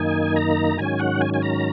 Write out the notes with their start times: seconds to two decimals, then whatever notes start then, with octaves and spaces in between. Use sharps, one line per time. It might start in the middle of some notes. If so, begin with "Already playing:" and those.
Already playing: F#2 D#3 A#3 D#4 G#5
0.36 A#5
0.78 G#2 D#3 F#3 C#4 G#5
0.99 F#5
1.21 G#5
1.34 G#5
1.43 A#5